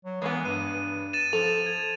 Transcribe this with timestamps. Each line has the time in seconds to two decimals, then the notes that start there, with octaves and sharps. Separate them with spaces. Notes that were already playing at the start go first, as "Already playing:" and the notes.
0.05 F#3
0.22 E3 G#3 A#3 B3
0.45 G2 D#7
1.13 A6 D#7 E7
1.33 F3 A4 F7
1.66 G#6